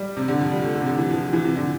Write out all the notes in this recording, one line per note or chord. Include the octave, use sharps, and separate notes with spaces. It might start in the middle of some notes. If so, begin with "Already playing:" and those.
Already playing: G3
C3
D3
F3
G3
A3
D3
C3
D3
E3
F3
F3
E3
C3
D3